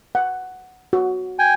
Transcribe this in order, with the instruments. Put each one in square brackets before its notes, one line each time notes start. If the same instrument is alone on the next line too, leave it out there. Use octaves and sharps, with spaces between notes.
[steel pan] F#5
F#4
[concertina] G5 G#5